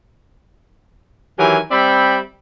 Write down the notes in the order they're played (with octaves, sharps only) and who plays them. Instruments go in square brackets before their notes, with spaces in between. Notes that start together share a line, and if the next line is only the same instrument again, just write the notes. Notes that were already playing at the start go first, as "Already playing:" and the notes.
[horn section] D#3 E3 F#3 G4 A#4 G#5
G3 C4 D5 E5 G5 B5